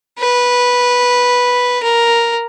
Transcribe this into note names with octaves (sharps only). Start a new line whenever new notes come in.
B4
A#4